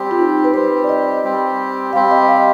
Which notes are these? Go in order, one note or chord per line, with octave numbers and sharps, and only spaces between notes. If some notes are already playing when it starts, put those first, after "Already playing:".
Already playing: G3 C4 G4
F4
D#4
B4
G3 C4 G4 C5
D5
D#5
G3 C4 G4
G3 C4 G4 F5
D#5
D#5
F5